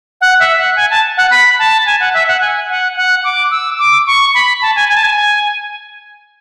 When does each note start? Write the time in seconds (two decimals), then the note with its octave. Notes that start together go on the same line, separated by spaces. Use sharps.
0.21 F#5
0.40 E5
0.58 F#5
0.76 G#5
0.90 A5
1.17 F#5
1.31 B5
1.59 A5
1.86 G#5
2.00 F#5
2.14 E5
2.28 F#5
2.41 G#5
2.69 F#5
2.96 F#5
3.24 D6
3.51 E6
3.79 D6
4.07 C#6
4.34 B5
4.62 A5
4.76 G#5
4.89 G#5
4.97 A5
5.03 G#5